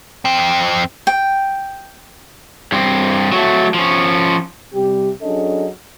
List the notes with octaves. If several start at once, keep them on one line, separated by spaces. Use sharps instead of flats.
F2 C4
G5
G2 C4
F#3 A3
F3 C#4
C3 G3 G4
F#3 C#4 D4 G#4 A4 D#5